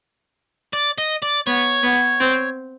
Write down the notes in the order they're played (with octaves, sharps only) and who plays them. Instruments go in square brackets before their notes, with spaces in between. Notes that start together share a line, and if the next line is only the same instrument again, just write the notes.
[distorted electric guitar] D5
D#5
D5
[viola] B3 [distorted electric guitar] C#5
[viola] B3
C4